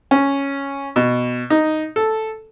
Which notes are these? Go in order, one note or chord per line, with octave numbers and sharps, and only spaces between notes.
C#4
B2
D#4
A4